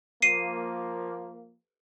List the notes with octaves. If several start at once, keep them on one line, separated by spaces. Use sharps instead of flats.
F3 A#3 C7 D#7